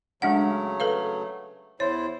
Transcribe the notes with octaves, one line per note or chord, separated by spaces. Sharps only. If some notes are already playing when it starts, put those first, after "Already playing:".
C#3 F#3 G#3 A3 D4 F#5
A4 B4 F5
E2 E4 C5 C#5